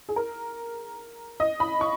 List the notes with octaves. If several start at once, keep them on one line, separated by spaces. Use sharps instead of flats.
G#4
A#4
D#5
B5
C#6